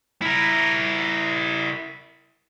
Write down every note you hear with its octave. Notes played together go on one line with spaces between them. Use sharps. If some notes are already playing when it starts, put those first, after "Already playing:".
E4 A#4